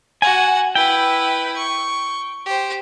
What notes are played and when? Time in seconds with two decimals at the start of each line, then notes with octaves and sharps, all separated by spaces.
0.22 F#4 F#5 G#5
0.75 E4 B4 G5
1.57 C#6
2.46 G4 C5